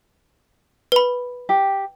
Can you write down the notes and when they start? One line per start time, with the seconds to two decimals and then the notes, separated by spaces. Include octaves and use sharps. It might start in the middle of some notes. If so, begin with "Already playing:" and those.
0.92 B4 B5
1.49 G4